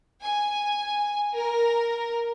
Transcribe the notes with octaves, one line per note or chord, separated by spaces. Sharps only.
G#5
A#4